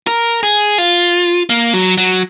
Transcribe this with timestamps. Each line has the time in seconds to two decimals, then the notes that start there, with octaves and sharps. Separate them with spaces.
0.07 A#4
0.43 G#4
0.78 F4
1.50 A#3
1.74 F#3
1.98 F#3